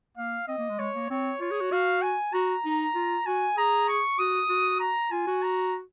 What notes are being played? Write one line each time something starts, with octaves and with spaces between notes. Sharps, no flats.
A#3 F5
C4 D#5
A#3
G#3
G#3 C#5
A#3
C4 C#5
F4 C#5
G#4
F#4
F#4 F5
G#5
F#4 A#5
D#4
F4
F#4 G#5
G#4 A#5
C#6
F#4 D#6
F#4
A#5
F4 G#5
F#4
A#5